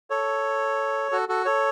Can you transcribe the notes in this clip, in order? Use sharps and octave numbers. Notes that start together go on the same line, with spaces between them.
A4 C#5
F#4 A4
F#4 A4
A4 C#5